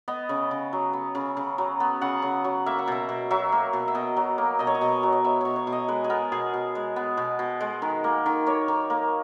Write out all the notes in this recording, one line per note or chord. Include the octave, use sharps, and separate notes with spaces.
B3 D#5
C#3
C#3
F#3
B3
C#3
C#3
F#3
B3
C#3 F#5
C#3
F#3
A#3 E5
F#5
B2 E5
B2
F#3 E5
A#3
B2
E5
B2 D#5
F#3
A#3
B2 D#5
C#5
D#5
B2
F#3
D#5
B3 E5
B2 C#5
C#5
B2
D#5
G#3 B4
G#4
B3 A#4
B2 G#4
B2
G#3
B3
B2
B2
G#3
D#3
A#3
D#3
A#3 C#5
D#3
A#3